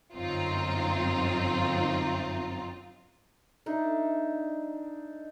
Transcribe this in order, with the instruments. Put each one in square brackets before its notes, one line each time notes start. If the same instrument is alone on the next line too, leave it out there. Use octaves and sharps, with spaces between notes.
[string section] G1 F#2 C4 D#4 F4
[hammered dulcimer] D4 D#4 E5